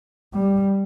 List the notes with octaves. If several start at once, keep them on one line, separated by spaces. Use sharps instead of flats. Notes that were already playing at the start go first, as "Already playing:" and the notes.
G3